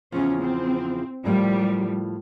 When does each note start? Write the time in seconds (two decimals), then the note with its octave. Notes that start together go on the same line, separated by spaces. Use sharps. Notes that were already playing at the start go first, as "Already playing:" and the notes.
0.12 E2 C#3 F3 C#4
0.41 C4
1.24 A2 F3 G3 A#3